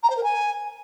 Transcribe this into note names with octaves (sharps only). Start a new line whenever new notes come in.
A#5
C5
A#4
G#5